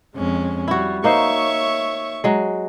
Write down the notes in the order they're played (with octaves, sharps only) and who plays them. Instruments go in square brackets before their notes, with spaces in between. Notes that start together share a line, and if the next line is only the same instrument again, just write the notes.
[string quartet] F2 G#3 C#4
[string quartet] G3 [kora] E4 F#4
[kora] A#3 D#4 C5 [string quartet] C#5 E5 C#6
[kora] F#3 G#3